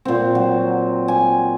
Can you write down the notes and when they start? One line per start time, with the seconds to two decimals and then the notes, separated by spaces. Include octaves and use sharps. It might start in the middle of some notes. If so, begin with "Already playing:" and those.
0.05 A#2 C4
0.35 F#3
1.08 G#5